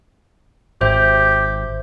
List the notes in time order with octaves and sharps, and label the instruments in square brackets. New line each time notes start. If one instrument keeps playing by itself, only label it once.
[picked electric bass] G#1 [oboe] G4 [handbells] C5 E5